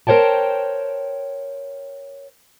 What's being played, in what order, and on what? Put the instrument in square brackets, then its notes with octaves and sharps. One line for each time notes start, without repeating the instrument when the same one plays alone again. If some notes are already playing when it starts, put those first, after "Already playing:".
[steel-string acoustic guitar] A#4 C5 C#5 G5 A5